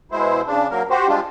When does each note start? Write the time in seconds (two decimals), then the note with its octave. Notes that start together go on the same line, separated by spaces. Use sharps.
0.12 B2 G#3 E4 C5
0.47 C#3 D4
0.71 F#3 A#3 A#4
0.90 F#4 G4 C5
1.08 G3 G#3 D4 F4